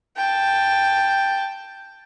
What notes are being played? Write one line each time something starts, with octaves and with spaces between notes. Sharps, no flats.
G5 A5